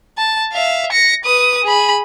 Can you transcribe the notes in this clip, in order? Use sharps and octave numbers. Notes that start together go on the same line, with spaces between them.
A5
E5 F5
A#6 C#7
B4 D#6
G#4 B5